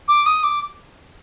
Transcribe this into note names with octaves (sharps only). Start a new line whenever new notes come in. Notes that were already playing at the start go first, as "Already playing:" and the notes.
D6
D#6
D6